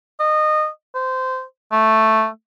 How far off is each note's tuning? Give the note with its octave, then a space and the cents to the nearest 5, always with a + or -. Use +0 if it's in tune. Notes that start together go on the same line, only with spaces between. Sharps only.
D#5 -20
C5 -20
A3 +0